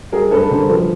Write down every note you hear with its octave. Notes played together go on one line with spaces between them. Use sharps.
G3 G#4 A#4
G2 A4 B4
D3 A#4 C5
F3 A4 B4